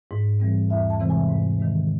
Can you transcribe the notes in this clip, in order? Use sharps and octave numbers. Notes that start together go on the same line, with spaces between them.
G#2
E3 G3 C4
E2 E5
A5
C3 E3 G#3 C4
G#5
G#2
D#3 G#3